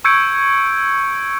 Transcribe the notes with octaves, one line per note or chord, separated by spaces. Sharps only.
C#6 E6 G6 G#6 C#7 D7